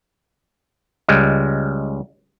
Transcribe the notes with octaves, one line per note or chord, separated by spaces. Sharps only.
C#2 G3 G#3